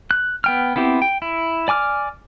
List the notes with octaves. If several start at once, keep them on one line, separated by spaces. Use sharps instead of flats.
F#6
B3 G5 F6
B3 C4 E4 G4
G5
E4
D5 G#5 D6 F6